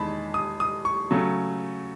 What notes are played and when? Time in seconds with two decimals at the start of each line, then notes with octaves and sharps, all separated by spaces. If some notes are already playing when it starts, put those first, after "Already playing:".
Already playing: E2 D#3 G#3 A5 B5
0.34 D#6
0.60 D#6
0.85 C#6
1.11 C#3 F#3 A3